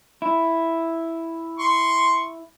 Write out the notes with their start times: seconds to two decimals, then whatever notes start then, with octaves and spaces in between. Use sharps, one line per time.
0.22 E4
1.59 C6 C#6